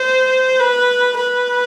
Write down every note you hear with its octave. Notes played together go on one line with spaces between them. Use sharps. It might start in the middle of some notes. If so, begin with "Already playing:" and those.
Already playing: C5
B4
B4